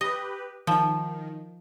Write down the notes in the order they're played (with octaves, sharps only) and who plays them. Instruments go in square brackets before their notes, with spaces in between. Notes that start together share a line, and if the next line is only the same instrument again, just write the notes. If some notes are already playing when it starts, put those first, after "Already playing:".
[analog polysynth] G4 B4 [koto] D#5
[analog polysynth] D#3 [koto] F3